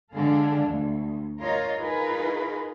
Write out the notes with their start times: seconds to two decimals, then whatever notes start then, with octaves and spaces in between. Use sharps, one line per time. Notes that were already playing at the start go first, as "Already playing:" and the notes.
0.13 D3 G#3 D4 G#4 A4 F5
0.67 D2
1.40 F4 A#4 C#5 D#5
1.76 D#4 F4 G#4 A#4 B4